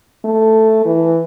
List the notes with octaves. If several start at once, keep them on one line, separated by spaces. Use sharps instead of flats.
A3
E3